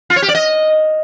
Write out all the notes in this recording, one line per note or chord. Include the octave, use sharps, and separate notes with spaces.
F4
C#5
G4
D5
D#5